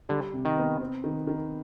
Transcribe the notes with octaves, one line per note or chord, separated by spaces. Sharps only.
D3 G3
C3
D#3
B3
C4
D#3
D#3